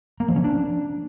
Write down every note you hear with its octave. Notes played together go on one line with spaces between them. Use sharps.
A#3
F3
C#4
D4